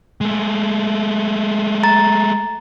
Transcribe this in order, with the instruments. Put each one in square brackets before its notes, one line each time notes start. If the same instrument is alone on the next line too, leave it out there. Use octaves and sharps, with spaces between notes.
[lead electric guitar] G#3 A3
[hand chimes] A#5 A6